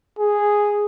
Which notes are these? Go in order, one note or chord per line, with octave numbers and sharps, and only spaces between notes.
G#4